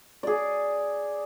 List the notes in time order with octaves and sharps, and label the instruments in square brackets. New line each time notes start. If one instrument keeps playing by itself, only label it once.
[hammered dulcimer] G#4 D5